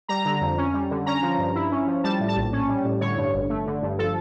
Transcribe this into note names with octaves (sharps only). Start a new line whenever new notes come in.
G3 A#5
D3
F2
C#4
G3
D3
C#4 A#5
F3
G2
E4
C#4
F3
G3 A5
A2
A5
A#1
C#4
G3
A2
D3 C#5
G2
G1
A3
D3
G2
F3 A4